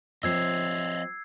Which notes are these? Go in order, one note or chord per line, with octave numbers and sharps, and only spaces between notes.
F3 C4 C5 C#5 D#5 E6 G#6 C7